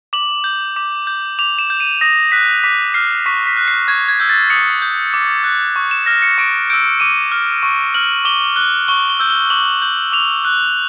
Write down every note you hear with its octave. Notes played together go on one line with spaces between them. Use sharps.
D6 F#7
G6
D6
G6
D6 F7
E7
G6
D#7
D#6 A#6
F#6 B6
D6 B6
F6 C7
C#6 B6
B6
F#6
C7
C#6 G#6
G#6
E6 G6
A6
D#6 C#7
G6
D6
F#6
C#6
E7
F6 A#6
C#7
C#6 D7
E6 G6 D7
D6 D#7
F6
C#6 D#7
F6 F#7
D6 G7
F#6 G7
C#6 G7
G7
E6 G6
G7
D6 F#7
G6 F#7
D6 F7
F#6